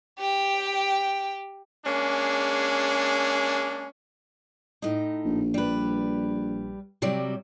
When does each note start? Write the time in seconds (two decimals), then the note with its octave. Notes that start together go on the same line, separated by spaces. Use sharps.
0.19 G4 G5
1.86 G#3 A#3 C#4 D4 G#4
4.82 A2 D#4
5.25 A#1
5.54 G3 B4
7.02 C3 F#3 G3